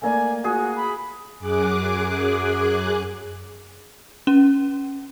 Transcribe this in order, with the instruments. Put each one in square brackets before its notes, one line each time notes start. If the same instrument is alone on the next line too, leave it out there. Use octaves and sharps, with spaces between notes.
[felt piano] A3 A#3 D5 [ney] G#5
[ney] F#4 [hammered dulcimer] G#4
[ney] B5
[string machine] F#2 G#4 D6 F#6
[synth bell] C#4